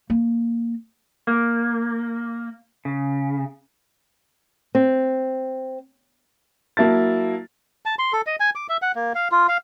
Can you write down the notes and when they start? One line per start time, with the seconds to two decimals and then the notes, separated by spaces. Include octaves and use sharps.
0.10 A#3
1.27 A#3
2.85 C#3
4.75 C4
6.77 F#3 A#3 E4 A5 A6
7.86 A5
7.99 C6
8.13 A4
8.27 D#5
8.40 G#5
8.55 D6
8.69 E5
8.82 F#5
8.95 A#3
9.15 F5
9.32 F4
9.48 F5